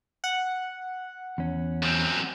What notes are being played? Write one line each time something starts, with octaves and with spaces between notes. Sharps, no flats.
F#5
E2 C#4
F#2 C4